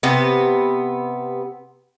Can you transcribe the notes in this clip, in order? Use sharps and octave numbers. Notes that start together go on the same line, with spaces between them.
C3 B3